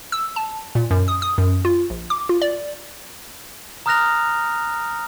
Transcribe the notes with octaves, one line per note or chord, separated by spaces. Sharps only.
E6
A5
A#2
F#2
D#6
D#6
F#2
F4
A#1
D6
F4
D5
A#5 D#6 F6 F#6 A#6 F7